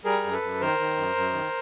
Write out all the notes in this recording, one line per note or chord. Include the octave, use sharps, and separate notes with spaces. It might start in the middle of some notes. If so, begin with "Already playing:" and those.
G3 G#4 A#4
F#2
A4 B4
F#2
D#3 A#4 C5
D#3
F#2
F#2
D#3